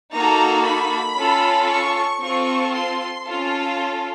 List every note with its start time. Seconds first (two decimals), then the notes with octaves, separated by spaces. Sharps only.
0.14 A#3 D#4 F#4 A4 A#5
0.66 B5
1.18 C#4 F4 A4
1.70 C#6
2.22 C4 F4 A4 C#6
2.74 C6
3.25 C#4 F4 A4